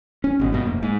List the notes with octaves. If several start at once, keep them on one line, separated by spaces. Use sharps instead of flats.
C#4
G#1 B2
G2 B2
F1 A#3
G#2